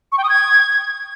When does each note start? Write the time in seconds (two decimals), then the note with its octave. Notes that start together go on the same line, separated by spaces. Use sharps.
0.12 C#6
0.18 G5
0.24 D#6
0.29 G#6